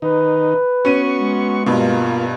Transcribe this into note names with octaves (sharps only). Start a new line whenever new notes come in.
D#3 D#4 B4
B3 C#4 F#4 C#6 D#7
G#3
G2 B2 A#3 F4